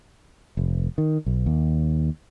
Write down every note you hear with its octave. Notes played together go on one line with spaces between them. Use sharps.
F1
D#3
B1
D#2